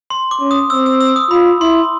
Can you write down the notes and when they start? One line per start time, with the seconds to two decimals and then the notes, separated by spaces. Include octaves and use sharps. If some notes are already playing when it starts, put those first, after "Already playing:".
0.10 C6
0.31 D6
0.40 C#4
0.51 D#6
0.70 C4 E6
0.86 E6
1.01 E6
1.16 D#6
1.31 F4 B5
1.60 E4 C6